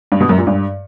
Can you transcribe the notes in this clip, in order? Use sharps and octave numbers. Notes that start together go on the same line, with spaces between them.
G2
B2
F#2
A#2
G2